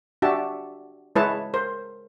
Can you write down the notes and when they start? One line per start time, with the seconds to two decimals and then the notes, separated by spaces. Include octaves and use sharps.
0.22 D4 F#4 G4 E5 A5
1.16 G#3 E4 B4 C#5 A5
1.54 A#4 C5